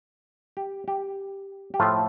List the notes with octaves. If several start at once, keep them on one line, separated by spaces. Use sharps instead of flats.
G4
G4
G4
A2 F3 A3 F4